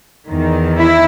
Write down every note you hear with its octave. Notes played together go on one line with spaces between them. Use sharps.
E2 D#3
E4